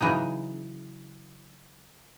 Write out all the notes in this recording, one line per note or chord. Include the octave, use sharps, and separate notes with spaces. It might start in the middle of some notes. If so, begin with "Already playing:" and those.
C#3 E3 F#3 D#4